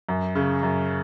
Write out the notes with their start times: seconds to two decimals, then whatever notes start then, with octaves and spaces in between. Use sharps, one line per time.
0.09 F#2
0.35 C#3
0.63 F#2